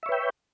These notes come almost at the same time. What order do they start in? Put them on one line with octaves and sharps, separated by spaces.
E5 C#5 B4 G5